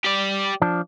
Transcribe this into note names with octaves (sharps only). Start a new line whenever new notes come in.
G4 D5
F3 D4